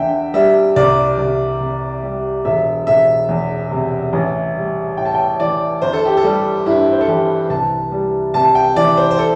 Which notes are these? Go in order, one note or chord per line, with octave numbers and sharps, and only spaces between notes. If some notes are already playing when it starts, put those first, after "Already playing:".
Already playing: E2 D3 E5 G5
G3 E5
C2 D5
C2
C3
G3
E1 E5
E1 E5
E2
C3
A1
G3
A2 G5
A5
G5
E3 D5
G1 C5
A4
G4
A4
G3
G2 E4
C5
A4
E3 G4
C2 A5
G3
C3 A5
G5
E3 D5
C5
C5
A4